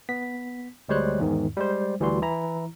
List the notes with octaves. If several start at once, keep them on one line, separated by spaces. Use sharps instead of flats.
B3 B6
D2 G3 G#3 C5 C#5 F#6
E2 G#2 D#3
G3 G#3 C5
D2 E3 G3 F#4 C6
E3 E4 A#5